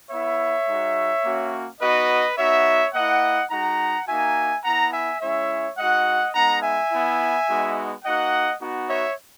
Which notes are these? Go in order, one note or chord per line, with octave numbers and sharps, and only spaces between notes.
B3 E4 C#5 E5
G#3 D#4 F#4
A#3 C#4 F#4
B3 D#4 F#4 B4 D#5
B3 D#4 F#4 C#5 E5
A#3 E4 D#5 F#5
G#3 D#4 F#4 F#5 A#5
A#3 D#4 F#4 E5 G#5
B3 E4 F#5 A#5
E5 G#5
G#3 C#4 E4 C#5 E5
G#3 D#4 F#4 D#5 F#5
G#3 B3 D#4 F#5 A#5
E5 G#5
B3 E4
G#3 B3 D#4 F#4
A#3 D#4 F#4 D#5 F#5
B3 D#4 F#4
C#5 E5